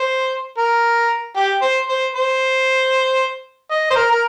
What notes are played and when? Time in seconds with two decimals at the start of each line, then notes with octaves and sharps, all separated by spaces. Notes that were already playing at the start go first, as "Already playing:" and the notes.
Already playing: C5
0.58 A#4
1.36 G4
1.62 C5
1.89 C5
2.15 C5
3.70 D#5
3.90 C5
3.96 A#4
4.11 A#4